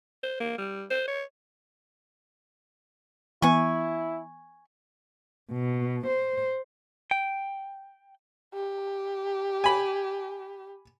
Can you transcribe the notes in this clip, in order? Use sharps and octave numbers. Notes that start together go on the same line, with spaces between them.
C5
A#3
G3
C5
C#5
E3 B3 E4 G#5 C#6
B2
C5
G5
G4
G#5 B5